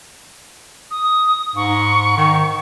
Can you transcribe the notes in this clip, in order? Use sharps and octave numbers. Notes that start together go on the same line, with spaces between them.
D#6
G#2 C#6
D#3